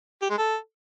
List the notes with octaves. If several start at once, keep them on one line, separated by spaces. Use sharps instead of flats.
G4
G#3
A4